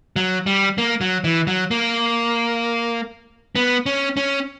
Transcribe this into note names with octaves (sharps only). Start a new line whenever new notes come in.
F#3
G3
A#3
F#3
E3
F#3
A#3
B3
C#4
C#4